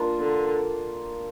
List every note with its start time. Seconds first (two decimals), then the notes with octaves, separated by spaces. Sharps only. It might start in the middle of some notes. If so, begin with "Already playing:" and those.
Already playing: A#3 D4 F4
0.19 D3